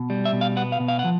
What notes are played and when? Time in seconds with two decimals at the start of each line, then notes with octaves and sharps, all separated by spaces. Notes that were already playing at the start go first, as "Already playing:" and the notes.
Already playing: B2
0.10 G3
0.25 E5
0.33 B2
0.41 F5
0.57 B3 F#5
0.72 F5
0.80 B2
0.88 F5
0.99 F#5
1.04 F3